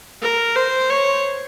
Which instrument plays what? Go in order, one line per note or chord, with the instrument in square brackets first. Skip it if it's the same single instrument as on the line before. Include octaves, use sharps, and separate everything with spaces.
[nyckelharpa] A#4
C5
C#5